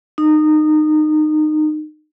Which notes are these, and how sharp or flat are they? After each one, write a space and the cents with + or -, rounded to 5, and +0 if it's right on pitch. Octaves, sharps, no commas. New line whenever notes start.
D#4 -25